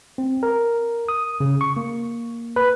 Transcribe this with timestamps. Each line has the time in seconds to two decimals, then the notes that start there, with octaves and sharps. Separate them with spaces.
0.18 C4
0.43 A#4
1.09 D#6
1.40 C#3
1.61 C#6
1.77 A#3
2.56 B4